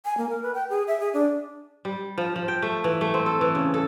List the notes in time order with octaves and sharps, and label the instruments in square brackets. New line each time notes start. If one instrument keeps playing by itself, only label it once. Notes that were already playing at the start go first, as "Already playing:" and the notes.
[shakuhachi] G#5
A#3
A#4
B4
G5
G#4
E5
G#4
D4
[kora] G3
F3
F3
G5
A3
E3
A3
C4
A4
E3
C#3
A4